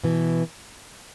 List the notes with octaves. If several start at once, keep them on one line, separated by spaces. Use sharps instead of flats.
B2 E3